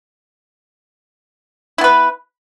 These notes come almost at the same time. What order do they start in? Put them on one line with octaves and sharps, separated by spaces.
E4 B3 B4